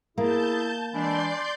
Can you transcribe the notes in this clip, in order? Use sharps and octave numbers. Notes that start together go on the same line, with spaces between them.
A#3 E4 G#4 A5 G6
E3 G#3 D4 D5 C6 G6